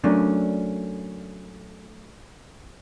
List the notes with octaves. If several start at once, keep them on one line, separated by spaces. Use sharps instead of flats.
F#3 A3 A#3 C#4 D4 D5